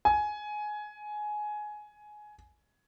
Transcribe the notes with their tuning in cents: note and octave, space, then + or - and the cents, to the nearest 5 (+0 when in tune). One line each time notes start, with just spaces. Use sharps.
G#5 +15